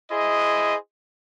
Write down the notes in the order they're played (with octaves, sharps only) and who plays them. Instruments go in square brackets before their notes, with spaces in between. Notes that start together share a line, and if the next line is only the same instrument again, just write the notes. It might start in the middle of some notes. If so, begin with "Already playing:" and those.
[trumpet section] E4 G#4 C5 D#5